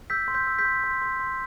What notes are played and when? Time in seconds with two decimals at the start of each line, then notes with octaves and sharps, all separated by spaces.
0.10 E6 G6 B6
0.28 C6
0.34 G6 B6
0.47 E6
0.59 G6 B6
0.65 C6
0.84 C6
1.02 C6
1.20 C6